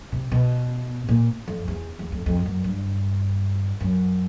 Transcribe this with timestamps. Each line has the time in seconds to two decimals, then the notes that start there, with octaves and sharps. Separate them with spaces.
0.12 C3
0.32 B2
1.09 A#2
1.48 F2
1.68 E2
1.99 E2
2.12 F2
2.26 F2
2.46 F#2
2.64 G2
3.81 F#2